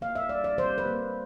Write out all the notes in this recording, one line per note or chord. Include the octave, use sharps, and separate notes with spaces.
A#3 F5
E5
G3 D5
D5
G3 C5
B4
A#3